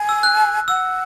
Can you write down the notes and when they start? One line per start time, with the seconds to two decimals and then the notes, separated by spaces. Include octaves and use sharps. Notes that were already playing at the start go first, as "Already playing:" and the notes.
Already playing: G#5
0.09 E6
0.23 F#6
0.68 F#5 E6